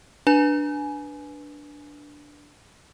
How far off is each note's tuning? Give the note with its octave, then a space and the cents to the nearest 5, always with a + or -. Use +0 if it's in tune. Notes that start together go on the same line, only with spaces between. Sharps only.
D4 +0 B4 -10 G#5 +15